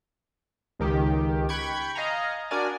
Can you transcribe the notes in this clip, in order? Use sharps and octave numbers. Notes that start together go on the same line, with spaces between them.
C#2 D#3 G4
G5 B5 C#6 F#6 G#6
D#5 F5 G#5 A#5
D4 F#4 A#4 D5 G#5